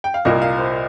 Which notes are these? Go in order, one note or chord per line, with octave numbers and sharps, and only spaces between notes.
G5
F5
C2 A#2 A#3 D#5
F5
C5